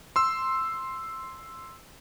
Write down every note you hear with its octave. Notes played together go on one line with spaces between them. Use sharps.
C6 E6